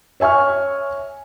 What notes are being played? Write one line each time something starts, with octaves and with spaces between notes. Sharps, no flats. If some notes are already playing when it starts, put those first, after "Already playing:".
C#5 E5 G#5 C#6 F6